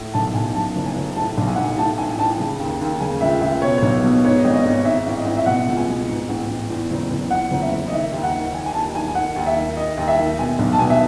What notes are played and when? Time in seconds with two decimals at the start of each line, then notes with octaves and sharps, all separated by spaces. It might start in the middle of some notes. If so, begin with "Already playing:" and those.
Already playing: A2
0.14 B1 A5
0.34 B1 G#5
0.54 F#2 A5
0.76 F#1
0.86 G#5
0.96 F#1
1.16 A2 A5
1.38 B1
1.47 G#5
1.56 B1 F#5
1.64 G#5
1.78 A2 A5
1.98 A1 G#5
2.18 A1 A5
2.40 C#3
2.60 D#2
2.81 D#2
3.00 C#3 G#5
3.21 C#2 E5
3.41 C#2 E5
3.62 B2 C#5
3.78 B1 C#5
4.04 B2
4.24 G#2 C#5
4.39 D#5
4.45 G#1
4.54 D#5
4.65 G#1 C#5
4.85 G#2 E5
5.06 A1
5.17 D#5
5.26 A1
5.37 E5
5.46 B2 F#5
5.67 C#2
5.77 G#5
5.88 B2
6.08 G#2
6.29 A1
6.49 A1
6.70 E2
6.91 F#1
7.11 F#1
7.31 E2 F#5
7.51 F#1
7.62 E5
7.72 F#1
7.88 D#5
7.92 D#3 E5
8.13 D#2
8.23 F#5
8.34 D#3
8.54 D#3 G#5
8.66 G#5
8.74 D#2 A5
8.95 D#3 G#5
9.08 G#5
9.15 D#3 F#5
9.36 D#2
9.46 E5
9.57 D#3
9.77 D#3 D#5
9.97 D#2
10.08 E5
10.19 D#3
10.39 B2 G#5
10.59 B1
10.73 A5
10.79 B2 G#5
10.90 E5